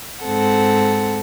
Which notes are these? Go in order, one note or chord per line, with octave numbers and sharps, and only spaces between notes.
G#2 C4 A4 F#5